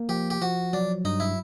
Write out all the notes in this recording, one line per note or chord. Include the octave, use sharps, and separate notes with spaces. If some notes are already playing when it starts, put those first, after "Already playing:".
Already playing: A#3
F3 G4
G4
F3 F#4
F#3 D4
G2 D#4
E4